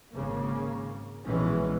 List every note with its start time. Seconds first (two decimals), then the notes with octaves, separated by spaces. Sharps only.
0.13 G#1 C#3 A#3
1.24 A#1 B2 E3 G#3 C#4